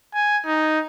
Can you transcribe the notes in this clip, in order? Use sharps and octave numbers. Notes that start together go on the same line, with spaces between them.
G#5
D#4